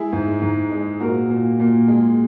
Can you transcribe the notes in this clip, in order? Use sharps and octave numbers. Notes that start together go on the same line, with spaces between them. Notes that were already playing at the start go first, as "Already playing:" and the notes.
Already playing: G#3 E4 G#4
G#2
G#2
G#3
A#2 F#4 A#4
A#2
A#2
G#3